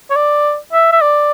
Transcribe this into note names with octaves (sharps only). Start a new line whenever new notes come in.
C#5
D5
E5
E5
D5